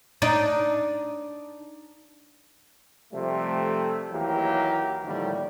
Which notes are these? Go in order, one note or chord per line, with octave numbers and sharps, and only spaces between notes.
D4 D#4
C3 F3 G3 A3
D#2 E3 F#3 A#3 G4 A#4
A2 D3 D#3 F3 G3 A#3